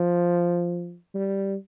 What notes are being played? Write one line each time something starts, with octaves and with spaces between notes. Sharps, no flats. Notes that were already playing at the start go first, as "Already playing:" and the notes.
Already playing: F3
G3